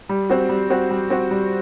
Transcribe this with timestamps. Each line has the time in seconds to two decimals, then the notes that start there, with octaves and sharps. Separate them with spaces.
0.09 G3
0.30 C4 F#4
0.49 G3
0.70 C4 F#4
0.90 G3
1.10 C4 F#4
1.31 G3